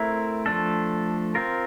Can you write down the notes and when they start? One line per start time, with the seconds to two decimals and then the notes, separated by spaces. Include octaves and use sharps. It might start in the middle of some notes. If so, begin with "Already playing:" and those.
Already playing: A3 C4 E4 A#4
0.46 F3 A3 D4 A4
1.35 C4 F4 A#4